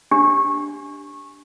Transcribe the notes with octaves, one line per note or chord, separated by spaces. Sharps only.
D4 G4